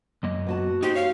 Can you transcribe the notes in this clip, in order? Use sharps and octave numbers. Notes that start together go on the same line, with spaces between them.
F#2 A#3 D#5
B3 F#4 A5
D#4 G4 C5
C#5 F5